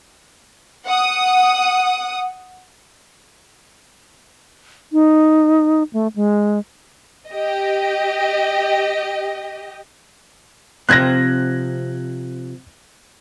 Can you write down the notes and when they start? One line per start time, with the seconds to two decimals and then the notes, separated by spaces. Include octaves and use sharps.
0.86 F#5 D#6
4.93 D#4
5.93 A3
6.16 G#3
7.29 G4 D#5
10.89 C3 F3 C4 F#6 G#6 A#6